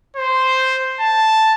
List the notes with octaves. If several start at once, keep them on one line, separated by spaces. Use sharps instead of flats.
C5
A5